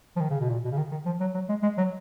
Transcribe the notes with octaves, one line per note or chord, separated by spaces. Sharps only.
F3
D#3
C#3
B2
A#2
B2
C#3
D#3
D#3
F3
F#3
F#3
G#3
G#3
F#3